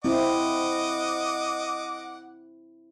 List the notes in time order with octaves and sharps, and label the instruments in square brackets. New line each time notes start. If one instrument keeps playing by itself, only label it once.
[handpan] C4 E4 [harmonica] D#5 F#5 D6